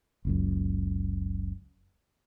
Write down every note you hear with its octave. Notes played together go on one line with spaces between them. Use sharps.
F#1 C#2 F#2